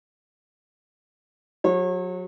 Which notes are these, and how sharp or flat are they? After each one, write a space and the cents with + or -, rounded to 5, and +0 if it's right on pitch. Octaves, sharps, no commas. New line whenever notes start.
F#3 -25 G4 +35 C#5 -35